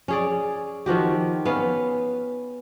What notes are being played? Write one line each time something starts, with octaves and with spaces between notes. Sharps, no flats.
C#4 G#4 D5
D#3 F3 F#4 G4
B3 C#4 F5